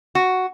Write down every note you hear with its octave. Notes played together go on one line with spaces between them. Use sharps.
F#4